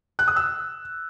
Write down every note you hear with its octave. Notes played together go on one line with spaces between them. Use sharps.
F#6
D#6
E6